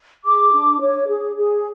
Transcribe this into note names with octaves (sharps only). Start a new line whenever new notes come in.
G#4 D6
D4
C#5
G#4
G#4